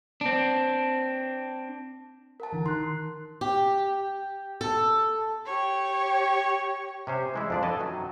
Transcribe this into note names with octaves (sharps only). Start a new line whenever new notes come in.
C4 D4
A#4 F#5 A5
D3 E3
D#3 C6 F#6
G4
A4
G4 C#5
C3 C#4 C5
E3 G#3 E4
F2 D4 D5
A4 B4 D#5 G#5 A5
F#2 D#3 F#3